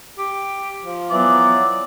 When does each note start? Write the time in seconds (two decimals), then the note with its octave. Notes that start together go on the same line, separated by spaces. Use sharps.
0.18 G4
0.85 F3
1.10 E3 F#3 B3 D5